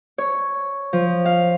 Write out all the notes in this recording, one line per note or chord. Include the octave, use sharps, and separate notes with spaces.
C#5
F3
F5